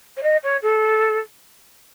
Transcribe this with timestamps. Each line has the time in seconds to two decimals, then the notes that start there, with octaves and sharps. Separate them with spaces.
0.16 C#5
0.23 D#5
0.43 C#5
0.62 A4